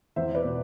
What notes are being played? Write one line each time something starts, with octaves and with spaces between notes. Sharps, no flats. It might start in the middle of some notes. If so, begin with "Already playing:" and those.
E2 C5 E5
B4 D5
B2